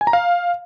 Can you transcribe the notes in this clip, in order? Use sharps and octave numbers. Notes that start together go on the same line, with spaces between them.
G#5
A#5
F5